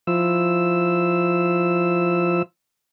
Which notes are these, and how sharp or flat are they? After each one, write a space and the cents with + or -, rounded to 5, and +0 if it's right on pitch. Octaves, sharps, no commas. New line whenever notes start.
F3 +0 E4 +0 E6 +0